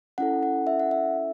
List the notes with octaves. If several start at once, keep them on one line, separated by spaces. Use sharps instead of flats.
C#4 E4 A4 F#5
F#5
E5
F#5
E5